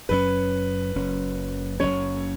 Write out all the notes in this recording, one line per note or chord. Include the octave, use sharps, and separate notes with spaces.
F#1 F#2 F#3 C#4 B4
F#1 F#2 F#3 C#4
F#1 F#2 F#3 C#4 C#5